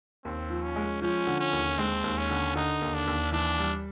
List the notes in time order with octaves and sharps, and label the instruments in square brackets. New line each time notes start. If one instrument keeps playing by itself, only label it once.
[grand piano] D#2 [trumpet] C4
[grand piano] F3
[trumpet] C#4
[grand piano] G#3
[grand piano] F3 [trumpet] C#4
[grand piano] D3
[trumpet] C#4
[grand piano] D#2
[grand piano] G#3 [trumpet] C4
[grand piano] D#2
[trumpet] C#4
[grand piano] D3
[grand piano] D3 [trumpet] D#4
[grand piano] D#2
[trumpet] D4
[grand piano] D#2
[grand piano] E3 [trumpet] D4
[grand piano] G3